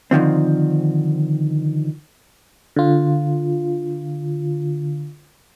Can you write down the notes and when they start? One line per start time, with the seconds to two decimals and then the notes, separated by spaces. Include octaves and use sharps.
0.11 D3 D#3 F3 C4
2.76 D3 F4